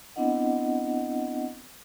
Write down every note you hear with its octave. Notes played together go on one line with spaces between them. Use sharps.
B3 C4 D4 E4 D#5 F#5